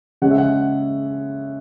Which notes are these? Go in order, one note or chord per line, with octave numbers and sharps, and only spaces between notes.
C#3 G#3 C#4 F#5
E5
F#5